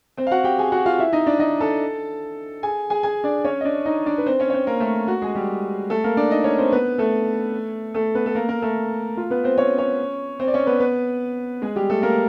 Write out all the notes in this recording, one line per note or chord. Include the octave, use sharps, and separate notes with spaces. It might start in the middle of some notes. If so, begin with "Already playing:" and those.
C4 C5
F5
F#4 F#5
G4 G5
G#4 G#5
F#4 F#5
F4 F5
E4 E5
D#4 D#5
D4 D5
D#4 D#5
A4 A5
G#4 G#5
G#4 G#5
G#4 G#5
D4 D5
C#4 C#5
D#5
D4 D5
D#4 D#5
D4 D5
B4
C4 C5
C#4 C#5
C#5
C4 C5
A#3 A#4
A3 A4
F#4
G#3 G#4
G3 G4
A3 A4
A#3 A#4
D4 D5
D#4 D#5
C#4 C#5
C4 C5
B3 B4
A3 A4
A3 A4
B3 B4
A4
A#3 A#4
A#3 A#4
A3 A4
F4
B3 B4
C4 C5
C#4 C#5
C#4 C#5
C4 C5
D5
C#4 C#5
B3 B4
B3 B4
G#3 G#4
G3 G4
A3 A4
A#3 A#4